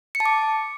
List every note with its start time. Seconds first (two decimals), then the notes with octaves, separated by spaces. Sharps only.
0.15 C#7
0.20 A5
0.26 D6